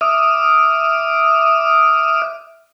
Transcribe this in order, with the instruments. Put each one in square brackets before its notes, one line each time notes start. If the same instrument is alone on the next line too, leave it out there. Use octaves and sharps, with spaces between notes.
[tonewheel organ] E5 D6 D#6 F6